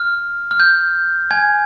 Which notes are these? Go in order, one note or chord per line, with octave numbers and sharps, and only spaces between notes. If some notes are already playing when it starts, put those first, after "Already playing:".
Already playing: F6
F6
G6
G#5 G#6